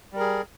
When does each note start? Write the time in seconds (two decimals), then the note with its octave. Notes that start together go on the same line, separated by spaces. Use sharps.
0.12 G3
0.16 A#4
0.20 G#4